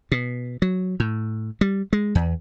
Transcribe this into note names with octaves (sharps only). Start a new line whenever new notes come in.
B2
F#3
A2
G3
G#3
E2